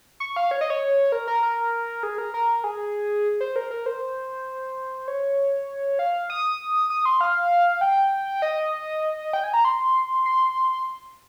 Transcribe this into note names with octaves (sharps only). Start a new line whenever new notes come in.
C#6
F5
C#5
D#5
C#5
A#4
A#4
A#4
G#4
A#4
A#4
G#4
C5
A#4
A#4
C5
C#5
F5
D#6
D#6
C6
F5
G5
D#5
G5
G#5
A#5
C6
C6